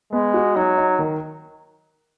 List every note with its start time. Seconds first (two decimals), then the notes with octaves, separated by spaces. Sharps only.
0.13 G#3 B3
0.34 F#4
0.56 F#3 D#4
0.78 D#4
0.99 D#3